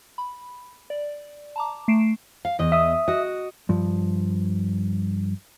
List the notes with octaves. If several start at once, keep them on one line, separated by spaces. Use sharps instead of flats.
B5
D5
A5 A#5 D6
A3 C7 D7 E7
F5
E2 D#5
E5 D#6
F#4 D#5
G2 F3